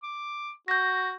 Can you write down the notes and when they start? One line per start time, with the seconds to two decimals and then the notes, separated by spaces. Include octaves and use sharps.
0.03 D6
0.68 F#4 G6 A#6